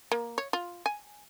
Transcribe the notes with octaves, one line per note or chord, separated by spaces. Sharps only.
A#3
C#5
F4
G#5